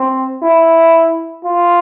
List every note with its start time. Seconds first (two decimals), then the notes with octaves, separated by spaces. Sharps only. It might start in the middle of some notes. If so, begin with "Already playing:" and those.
Already playing: C4
0.42 E4
1.44 F4